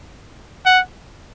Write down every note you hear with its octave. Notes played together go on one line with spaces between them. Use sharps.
F#5